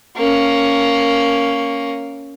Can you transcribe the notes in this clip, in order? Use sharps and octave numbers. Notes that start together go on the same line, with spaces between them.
A#3 C#4